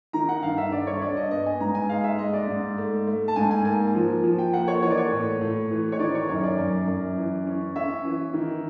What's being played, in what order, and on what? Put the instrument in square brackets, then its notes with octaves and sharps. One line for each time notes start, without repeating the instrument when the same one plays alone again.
[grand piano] D#3 A#5
F#5
G2 F5
E5
G2 D5
C#5
G2 D5
D#5
B3 D#5
G#5
G#2 A#5
G#5
G#3 F5
E5
G#3 D#5
D5
G#2
A3
A3
A5
G#2 G#5
G#5
A#3 G#5
F3
F3
G5
A#3 F#5
C#5
E3 C#5
D5
C#5
A2
A2
E3
C#5
D#3 D5
C#5
F#2 C#5
D5
F#2
F#2
E3
C#4
C#4 E5
E3
D#3